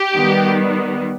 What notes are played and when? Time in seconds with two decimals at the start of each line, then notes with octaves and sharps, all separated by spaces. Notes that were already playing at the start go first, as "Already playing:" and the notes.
Already playing: G4
0.15 D#3 G3 B3